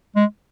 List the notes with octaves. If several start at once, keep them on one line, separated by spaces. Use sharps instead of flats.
G#3